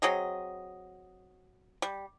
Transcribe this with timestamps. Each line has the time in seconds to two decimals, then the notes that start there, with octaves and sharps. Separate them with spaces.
0.02 F#3 C4 G#4 D#5
1.82 G3